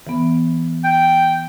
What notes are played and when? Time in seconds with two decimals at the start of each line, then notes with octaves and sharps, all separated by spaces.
0.07 E3 B3
0.84 G5